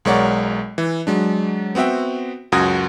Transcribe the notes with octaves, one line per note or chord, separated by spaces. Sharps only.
B1 G#3 A#4 C#5 D5 F#5
E3
F#3 G#3 D4
B3 C4 F#4 E5 G5
C#2 F#2 F#4 D#6 G#6 A#6